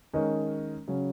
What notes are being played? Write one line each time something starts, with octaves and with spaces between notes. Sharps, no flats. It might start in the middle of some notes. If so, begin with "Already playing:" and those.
D#3 G#3 C#4 A#4 D#5
C#3 F#3 C#4